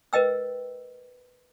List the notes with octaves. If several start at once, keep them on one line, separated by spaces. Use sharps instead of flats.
A#4 B4 D#5 G5 E6